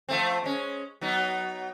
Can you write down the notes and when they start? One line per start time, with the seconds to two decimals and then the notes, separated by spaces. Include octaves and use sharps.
0.09 F3 A3 C4
0.44 G#3 C#4
1.01 F#3 B3 D#4